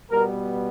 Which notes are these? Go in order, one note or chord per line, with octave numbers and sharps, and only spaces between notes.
B2 G3 B3 A#4